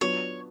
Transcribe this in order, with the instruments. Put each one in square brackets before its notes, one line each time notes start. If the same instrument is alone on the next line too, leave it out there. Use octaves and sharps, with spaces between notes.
[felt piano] F#3 B3 D4 F4 [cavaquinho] C#5